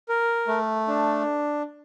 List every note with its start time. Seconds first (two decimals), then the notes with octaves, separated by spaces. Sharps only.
0.09 A#4
0.48 A3
0.88 D4